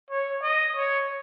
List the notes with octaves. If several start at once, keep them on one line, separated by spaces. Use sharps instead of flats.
C#5
D#5
C#5